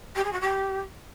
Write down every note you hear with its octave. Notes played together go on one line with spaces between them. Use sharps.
G4
G#4
F#4
G4